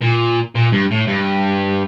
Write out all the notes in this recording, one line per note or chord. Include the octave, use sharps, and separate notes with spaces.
A#2
A#2
G2
A2
G2